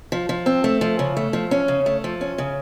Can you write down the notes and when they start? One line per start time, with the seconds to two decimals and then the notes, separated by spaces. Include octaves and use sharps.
0.12 F3
0.29 F3
0.46 C4
0.64 A3
0.81 F3
0.99 C#3
1.17 A3
1.33 F3
1.51 C#4
1.68 C#3
1.86 A3
2.04 F3
2.21 C#4
2.38 C#3